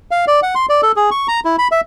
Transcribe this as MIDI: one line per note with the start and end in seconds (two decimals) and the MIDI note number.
0.11 0.25 77
0.27 0.40 74
0.43 0.55 78
0.55 0.66 84
0.69 0.81 74
0.82 0.92 69
0.96 1.10 68
1.11 1.27 85
1.28 1.40 82
1.45 1.56 64
1.58 1.68 83
1.72 1.81 76